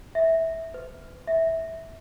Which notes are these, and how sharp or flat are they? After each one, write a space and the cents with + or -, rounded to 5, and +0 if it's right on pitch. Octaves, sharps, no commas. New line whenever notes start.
E5 -15
B4 +25
E5 -15